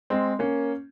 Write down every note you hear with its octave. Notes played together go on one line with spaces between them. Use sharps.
G#3 C4
A#3 C#4